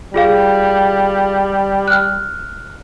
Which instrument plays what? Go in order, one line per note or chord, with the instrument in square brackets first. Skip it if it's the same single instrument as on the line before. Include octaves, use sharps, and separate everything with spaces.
[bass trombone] G3 [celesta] F4 G#4 F5
[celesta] F6 F#6